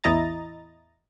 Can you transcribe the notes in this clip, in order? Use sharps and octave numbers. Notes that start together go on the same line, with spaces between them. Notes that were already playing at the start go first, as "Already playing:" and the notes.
A1 E2 E4 D#5 A#5 A6